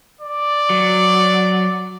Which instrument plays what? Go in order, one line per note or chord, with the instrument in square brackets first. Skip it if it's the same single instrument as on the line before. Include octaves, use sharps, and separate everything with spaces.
[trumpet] D5
[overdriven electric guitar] F#3